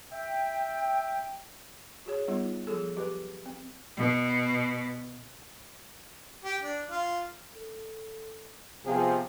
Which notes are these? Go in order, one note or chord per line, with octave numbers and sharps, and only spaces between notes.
E5 G5
F#4 G#4 C#5
G3 B3 D#4 F4
F3 F#3 G#4 A4
G4 B4
C4
B2
G4
D4
F4
A4
C3 F3 B3 G#4